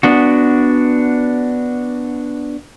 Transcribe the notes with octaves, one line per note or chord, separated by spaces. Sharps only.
B3 D4 F#4